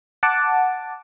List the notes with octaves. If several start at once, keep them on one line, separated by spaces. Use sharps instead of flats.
F#5 A5 D6